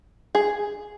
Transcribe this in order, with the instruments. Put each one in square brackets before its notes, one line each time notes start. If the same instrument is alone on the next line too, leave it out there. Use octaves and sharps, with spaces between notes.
[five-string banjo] G#4